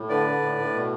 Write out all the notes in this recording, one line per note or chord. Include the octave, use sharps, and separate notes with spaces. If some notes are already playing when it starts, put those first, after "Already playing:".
Already playing: A2
D3 B4 D5
D3
A2
A2
B2